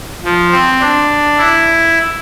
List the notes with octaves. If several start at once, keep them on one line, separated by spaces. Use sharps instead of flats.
F3
C4
D4
E4